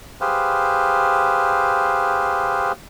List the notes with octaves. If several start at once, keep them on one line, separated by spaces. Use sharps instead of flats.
G4 G#4 B4 C5 F5